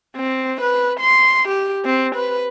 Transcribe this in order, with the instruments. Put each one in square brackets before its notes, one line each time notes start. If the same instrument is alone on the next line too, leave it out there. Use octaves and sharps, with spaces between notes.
[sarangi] C4
B4
C6
G4
C4
B4